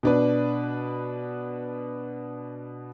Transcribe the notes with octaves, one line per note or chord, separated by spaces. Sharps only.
B2 D4 B4